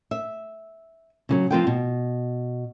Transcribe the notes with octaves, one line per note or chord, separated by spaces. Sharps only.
E5
C#3 E3 F#3
F3 C4 F4 B4 F5 G5
B2